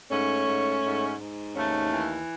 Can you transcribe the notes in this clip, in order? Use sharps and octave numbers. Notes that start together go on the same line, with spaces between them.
G#2 A3 C#4
G#2
G#2
G#2
D#2 A3 C#4
E3